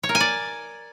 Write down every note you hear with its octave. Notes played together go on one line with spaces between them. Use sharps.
C#5
A#4
G#5
D5